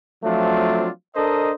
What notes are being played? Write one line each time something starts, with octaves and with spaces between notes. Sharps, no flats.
F3 F#3 A3 C4 D4 F4
D4 A4 A#4 C5 D#5